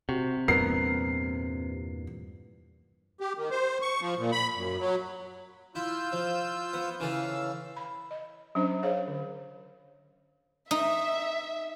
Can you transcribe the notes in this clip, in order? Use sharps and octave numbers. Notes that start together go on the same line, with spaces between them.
C3 F#4
E2 G2 A#2 B3 A#4 C7
G4
D#3
C5
C#6
F3
A#2
B5
F#2
F#3
E4 F4 E6 G6
F3
B3
C#3 E3 A4 F5 E6
B5
D#5
F#3 C#4 D4 C5
G#4 C5 C#5 F5
D3
D#4 E5